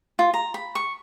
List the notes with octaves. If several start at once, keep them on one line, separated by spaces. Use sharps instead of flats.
F4
A#5
B5
C#6